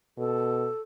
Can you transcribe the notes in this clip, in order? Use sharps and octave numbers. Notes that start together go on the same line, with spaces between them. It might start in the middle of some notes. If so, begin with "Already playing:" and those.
B2 A4